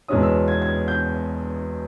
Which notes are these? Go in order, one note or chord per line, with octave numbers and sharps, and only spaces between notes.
E2 B2 G#3 C#4 D#6
E6
G#6
G#6
G6